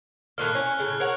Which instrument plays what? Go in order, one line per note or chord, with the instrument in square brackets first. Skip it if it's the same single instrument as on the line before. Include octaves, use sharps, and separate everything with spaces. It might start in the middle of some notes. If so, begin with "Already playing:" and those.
[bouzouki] A2 D#3 A#3 [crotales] F6 F#6
[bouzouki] C#4
A2 C#3
A#4 C#5 F#5